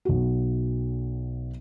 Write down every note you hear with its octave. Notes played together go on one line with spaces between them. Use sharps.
B1 F#4